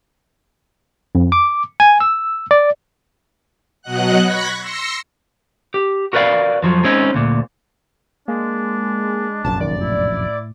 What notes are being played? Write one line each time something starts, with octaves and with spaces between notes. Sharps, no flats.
F2
D6
G#5
E6
D5
B2 F#3 D#5 F#5 F#6
B5 C#6 F#6 G#6 A#6 B6
C6 E6 A#6 C#7
G4
F#4 A#4 B4 D5 F5
F2 F3 F#3
G#3 C4 C#4 D#4
D2 A#2
G#3 A#3 D4
F1 A#1 F#2 A5
D#3 D5
A2 E4